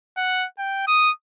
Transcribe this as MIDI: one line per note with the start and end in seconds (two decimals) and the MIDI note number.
0.17 0.46 78
0.59 0.85 79
0.87 1.10 87